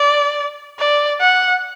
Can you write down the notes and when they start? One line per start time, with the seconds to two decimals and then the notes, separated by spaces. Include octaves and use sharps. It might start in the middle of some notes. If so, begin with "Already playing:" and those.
Already playing: D5
0.79 D5
1.21 F#5